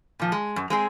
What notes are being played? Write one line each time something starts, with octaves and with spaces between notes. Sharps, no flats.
A#2 F3
G#3
F#2
G#3 C4 G#4